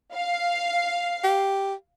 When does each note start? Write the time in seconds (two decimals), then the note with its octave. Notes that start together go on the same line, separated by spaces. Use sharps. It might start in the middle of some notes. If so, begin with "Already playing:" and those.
0.15 F5
1.24 G4